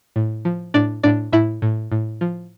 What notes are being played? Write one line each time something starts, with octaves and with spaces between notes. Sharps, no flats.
A2
F3
A2 D4 D5
A2 D4 D5
A2 E4 E5
A2
A2
F3